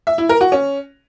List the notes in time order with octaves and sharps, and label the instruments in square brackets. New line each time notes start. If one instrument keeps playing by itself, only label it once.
[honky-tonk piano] E5
E4
A#4
F#4
C#4